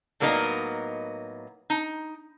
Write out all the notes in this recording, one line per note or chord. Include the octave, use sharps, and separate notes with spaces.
A2 F#3 A#3 B3 D#4 D#5
D#4